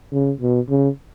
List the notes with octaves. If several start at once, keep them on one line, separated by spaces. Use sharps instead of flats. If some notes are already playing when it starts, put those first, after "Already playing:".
C#3
B2
C#3